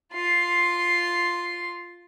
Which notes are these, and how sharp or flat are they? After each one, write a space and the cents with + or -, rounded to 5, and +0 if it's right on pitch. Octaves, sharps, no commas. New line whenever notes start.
F4 +0 C6 +0